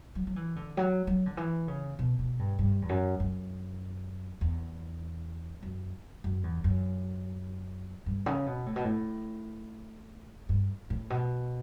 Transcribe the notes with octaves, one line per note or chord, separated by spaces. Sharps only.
F#3
F#3
E3
D3
F#3
F#3
D3
E3
C#3
B2
B2
G2
G2
E2
F#2
F#2
E2
F#2
F#2
E2
F#2
G2
C#3
B2
A2
B2
A2
G2
A2
B2